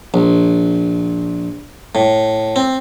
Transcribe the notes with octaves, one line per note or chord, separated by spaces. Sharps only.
A#1
A2
C4